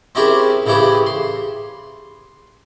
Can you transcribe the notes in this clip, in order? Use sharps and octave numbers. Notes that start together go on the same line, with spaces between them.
C4 C#4 E4 G4 G#4 A#4
A2 C#3 E3 E4 G4 G#4
C6